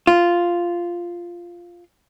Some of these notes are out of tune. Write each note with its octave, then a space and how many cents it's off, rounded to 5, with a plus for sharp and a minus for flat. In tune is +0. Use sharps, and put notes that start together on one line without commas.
F4 -5